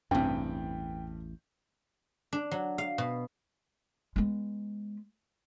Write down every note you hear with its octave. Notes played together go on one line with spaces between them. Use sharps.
A1 E2 G2 C3 G5
D4
F#3
F5
B2
G#3 B3